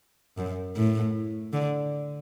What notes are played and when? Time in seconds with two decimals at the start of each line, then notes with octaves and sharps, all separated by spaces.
0.38 F#2
0.76 A2
1.53 D3